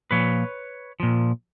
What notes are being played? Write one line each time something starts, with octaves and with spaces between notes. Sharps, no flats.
A#2 F3 B4 C#5
A#2 F3